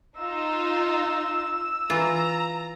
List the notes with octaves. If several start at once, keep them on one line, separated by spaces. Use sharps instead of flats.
D#4 F4 E6
E3 F4 A#5